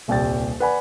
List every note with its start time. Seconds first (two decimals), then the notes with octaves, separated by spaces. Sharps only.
0.08 D#1 C2 D5 G5 A6
0.60 B4 D5 F#5 G#5 B5